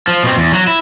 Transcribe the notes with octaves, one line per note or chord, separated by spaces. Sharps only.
F3
B2 C4
E2
F#3 F#4
E4